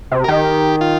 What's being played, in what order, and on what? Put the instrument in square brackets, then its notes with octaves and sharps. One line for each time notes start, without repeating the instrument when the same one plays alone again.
[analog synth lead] C3
[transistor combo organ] A#4
[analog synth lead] D#3 [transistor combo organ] G4
[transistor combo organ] F4